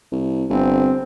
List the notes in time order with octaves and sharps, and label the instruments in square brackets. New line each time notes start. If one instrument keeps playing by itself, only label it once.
[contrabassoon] C2
[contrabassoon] G1 [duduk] C4